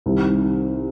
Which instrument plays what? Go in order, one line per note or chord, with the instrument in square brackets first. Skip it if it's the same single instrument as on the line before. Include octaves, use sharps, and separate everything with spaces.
[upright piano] C2 C3 D#3